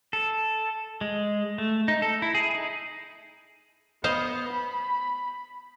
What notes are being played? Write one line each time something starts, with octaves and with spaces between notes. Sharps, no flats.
A4
G#3
A3
D#4
A4
E4
G#4
D#4
B3 C5 D#5 F5
B5